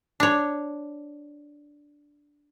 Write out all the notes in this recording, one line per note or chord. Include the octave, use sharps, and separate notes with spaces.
D4 C#5